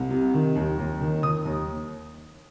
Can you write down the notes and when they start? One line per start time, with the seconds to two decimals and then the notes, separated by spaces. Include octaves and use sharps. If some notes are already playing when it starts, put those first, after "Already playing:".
Already playing: C2
0.11 C3
0.34 D#3
0.56 D#2
0.78 D#2
1.01 D#3
1.23 D#3 D#6
1.45 D#2